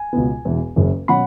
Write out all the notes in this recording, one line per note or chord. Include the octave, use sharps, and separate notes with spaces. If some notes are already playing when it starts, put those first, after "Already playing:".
Already playing: G#5
C#2 B2 B3
E1 E2 E3
F#1 F#2 C#3
B2 F#3 C#4 F#5 B5